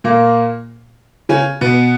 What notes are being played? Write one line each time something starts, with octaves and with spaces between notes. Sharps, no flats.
A#2 A#3
C#3 C#4
B2 B3